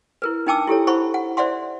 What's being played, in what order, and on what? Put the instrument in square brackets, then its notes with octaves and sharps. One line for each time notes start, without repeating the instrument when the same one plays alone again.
[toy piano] E4 A#4 B4
D4 D#4 G5 A5 D6 E6
E4 G4 A4 C#5
E4 C5 F#5 B5 C#6
F#5
C5 D5 E5 F#5 C6